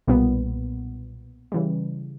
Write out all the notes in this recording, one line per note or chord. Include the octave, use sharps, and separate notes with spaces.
B1 A#2 G3 B3
C#3 E3 G3